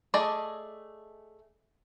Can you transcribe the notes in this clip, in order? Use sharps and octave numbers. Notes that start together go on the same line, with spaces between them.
A3 G#4 D5 D#5